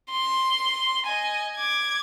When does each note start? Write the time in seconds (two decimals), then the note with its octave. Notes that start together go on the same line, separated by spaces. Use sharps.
0.11 C6
1.06 D#5 G#5
1.56 D6 G#6